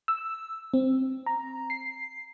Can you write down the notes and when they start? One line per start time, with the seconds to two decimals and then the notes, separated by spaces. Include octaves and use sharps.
0.08 E6
0.74 C4
1.26 A#5
1.70 C7